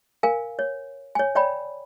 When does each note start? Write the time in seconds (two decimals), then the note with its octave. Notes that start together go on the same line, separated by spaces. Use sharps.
0.23 A#4 F5 G#5
0.59 C#5
1.15 C#5 G#5
1.35 C#5 D5 G5 A#5 B5